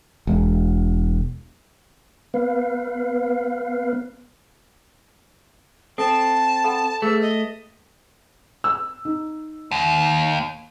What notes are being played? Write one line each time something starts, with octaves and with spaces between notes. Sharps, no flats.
E1
B3 B4 F5
C4 A4 A5
A4 F#5 B5
A3 G#4 B4 E6
D#5
E6
D#4
D#2